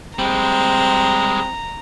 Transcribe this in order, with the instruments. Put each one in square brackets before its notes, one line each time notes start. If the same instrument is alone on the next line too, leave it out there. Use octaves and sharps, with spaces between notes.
[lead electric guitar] G3 G#3 [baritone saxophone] C4 [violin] A#5